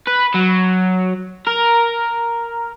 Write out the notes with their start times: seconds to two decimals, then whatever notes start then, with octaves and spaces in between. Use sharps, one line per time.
0.07 B4
0.34 F#3
1.47 A#4